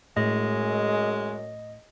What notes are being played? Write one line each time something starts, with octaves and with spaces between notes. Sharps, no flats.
F#2 A2 G#3 D#5